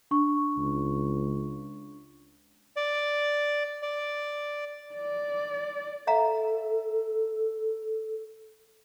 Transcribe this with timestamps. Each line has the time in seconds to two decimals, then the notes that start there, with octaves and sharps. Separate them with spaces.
0.11 D4 C#6
0.58 C#2
2.76 D5
3.82 D5
4.94 D5
6.07 A4 E5 F5 A#5